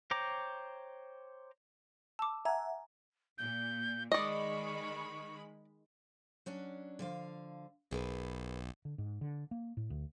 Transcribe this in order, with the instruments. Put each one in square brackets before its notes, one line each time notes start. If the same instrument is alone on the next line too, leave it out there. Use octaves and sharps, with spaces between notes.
[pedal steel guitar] C5 C#5 G5 A#5 D6
[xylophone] A5 D6 [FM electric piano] E6
[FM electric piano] E5 F#5 [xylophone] G#5 A#5 G#6
[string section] A#2 [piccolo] G6
[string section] D#3 G#3 B5 [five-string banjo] D5 D#5 [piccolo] C#6
[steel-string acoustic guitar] F#3 C#4 D4
D3 F3 F5
[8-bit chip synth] B1 [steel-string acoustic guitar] G#4 A#4 B4
[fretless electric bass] D3
G#2
D3
A#3
A2
D2